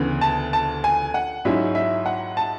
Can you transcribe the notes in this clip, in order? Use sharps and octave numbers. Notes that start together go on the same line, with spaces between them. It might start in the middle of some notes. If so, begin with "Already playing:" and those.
Already playing: D2 C#3 E3 B3
A5
A5
G#5
F#5
G#2 F#3 C#4 E4 E5
E5
F#5
A5